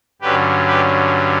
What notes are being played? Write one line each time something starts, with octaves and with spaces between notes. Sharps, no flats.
G2 D3 F#3 C#4 G4 B4
G4 B4